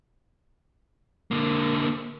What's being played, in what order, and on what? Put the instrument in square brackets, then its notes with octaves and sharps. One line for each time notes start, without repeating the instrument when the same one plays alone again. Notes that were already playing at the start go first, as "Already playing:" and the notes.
[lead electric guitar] D3 A#3